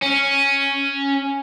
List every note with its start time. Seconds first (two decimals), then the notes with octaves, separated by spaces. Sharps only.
0.03 C#4